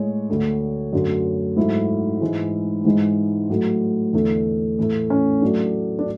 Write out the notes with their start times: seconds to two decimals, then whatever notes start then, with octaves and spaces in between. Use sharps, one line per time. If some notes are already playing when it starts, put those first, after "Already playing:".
Already playing: A2 G#3 C#5
0.29 D2 D3 A3
0.93 F#2 D3 A3
1.56 G#2 F#3 A3 E4
2.21 G#2 E3 G#3
2.85 G#2 E3 G#3
3.50 A2 F#3 A3
4.13 E2 D3 A3
4.78 A2 E3 A3
5.10 C#4
5.42 A2 F#3 A3 D4
5.99 D4